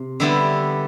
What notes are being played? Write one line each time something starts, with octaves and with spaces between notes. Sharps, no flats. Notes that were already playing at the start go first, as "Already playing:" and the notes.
Already playing: C3
D3 G3 B3 E4 G4